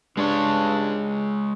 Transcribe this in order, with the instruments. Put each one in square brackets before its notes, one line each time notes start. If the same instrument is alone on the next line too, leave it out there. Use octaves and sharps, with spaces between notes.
[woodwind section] G2 D4 [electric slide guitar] G#3 G#4 C#5